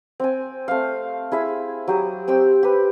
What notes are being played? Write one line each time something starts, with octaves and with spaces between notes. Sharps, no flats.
C4 G5 G#5
A3 C4 F5
E4 G#4 E5
F#3 G4 D#6
C4 G4 G5 E6
G4 B4